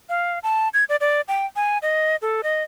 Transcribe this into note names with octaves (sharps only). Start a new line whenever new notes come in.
F5
A5
G#6
D5
D5
G5
G#5
D#5
A4
D#5